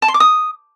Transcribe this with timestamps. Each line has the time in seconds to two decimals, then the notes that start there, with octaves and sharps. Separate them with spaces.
0.02 A5
0.08 C6
0.14 D6
0.20 D#6